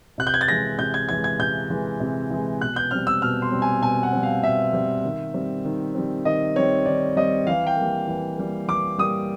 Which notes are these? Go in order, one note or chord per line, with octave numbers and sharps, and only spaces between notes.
C3 F#6
G6
G#6
A6
E3 G#3 A#6
C3 G6
G#6
E3 G#3 G#6
G#6
C3 G6
E3 G#3
C3
E3 G#3
B2 F#6
G6
G3 C4 F6
E6
B2 F6
C6
G3 C4
G#5
B2 G#5
F#5
G3 C4
F5
B2 E5
G3 C4
D#3
G3 C4
D#3
G3 C4
D#3 D#5
G3 C4 C#5
D#3 D5
G3 C4 D#5
E3 F5
G5
G3 A#3
E3
G3 A#3
E3 D6
G3 A#3 D#6